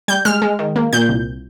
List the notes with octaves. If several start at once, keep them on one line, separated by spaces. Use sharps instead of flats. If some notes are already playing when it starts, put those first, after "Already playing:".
G3 G6
G#3 F6
G#3
D#3
A#3
A#2 G6
C2